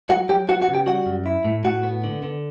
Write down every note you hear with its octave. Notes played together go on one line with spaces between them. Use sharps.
F#3 F#4 F#5
F#3 G4 G5
B3 F#4 F#5
F#4 F#5
C#3
G4 G5
G3 F#4 F#5
F#2
E4
A2
A2 F#4 F#5
B3
D3
D3